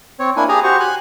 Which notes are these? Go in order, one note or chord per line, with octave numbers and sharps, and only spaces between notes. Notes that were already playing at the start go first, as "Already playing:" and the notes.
C4 C#5
A#3 D4 E4 G#5
G4 G#4 G#5 A#5
F#4 G4 C5 C#6
G#5 F#6